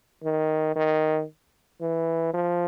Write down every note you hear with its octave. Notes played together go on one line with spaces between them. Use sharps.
D#3
D#3
E3
F3